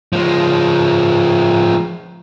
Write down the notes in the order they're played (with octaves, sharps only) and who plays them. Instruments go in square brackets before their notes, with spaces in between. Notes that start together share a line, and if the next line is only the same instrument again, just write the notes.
[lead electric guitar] F3 G#3